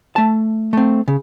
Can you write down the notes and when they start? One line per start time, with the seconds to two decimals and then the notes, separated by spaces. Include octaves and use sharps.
0.16 A3 A5
0.73 A3 C4
1.08 C#3